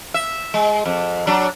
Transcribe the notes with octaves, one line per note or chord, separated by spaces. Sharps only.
E5
G#3
F2
F#3 D4